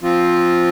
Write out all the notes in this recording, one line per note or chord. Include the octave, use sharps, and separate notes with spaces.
F3 C4 F4